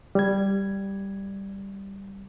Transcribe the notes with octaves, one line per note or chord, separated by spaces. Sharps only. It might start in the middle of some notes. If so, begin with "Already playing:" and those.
G3 G#6